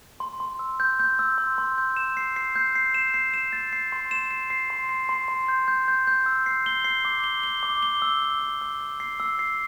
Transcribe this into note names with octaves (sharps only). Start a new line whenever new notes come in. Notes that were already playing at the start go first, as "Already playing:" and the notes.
C6
C6
E6
G6
G6
E6
C6
C6
G6
E7
C7
C7
G6
C7
E7
C7
E7
A6
C7
C6
E7
C7
C7
C6
C7
C6
C6
G6
G6
G6
G6
E6
C7
G7
C7
D6
G7
G7
D6
G7
E6
E6
E6
E6
E6
C7
E6
C7